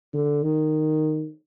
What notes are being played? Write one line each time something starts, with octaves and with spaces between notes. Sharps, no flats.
D3
D#3